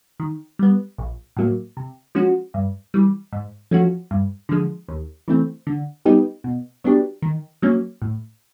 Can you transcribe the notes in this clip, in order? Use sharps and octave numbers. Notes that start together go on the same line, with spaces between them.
D#3
G3 B3
A#1
A2 F#3 A#3
C3
F3 G#3 C#4 F#4
G2
E3 G3
G#2
F3 A3 C#4 F#4
G2
D3 F3 G#3
D#2
C#3 E3 A3 C4
D3
G3 B3 D#4 G4
B2
F#3 B3 D4 G4
D#3
F#3 A#3 C#4
A2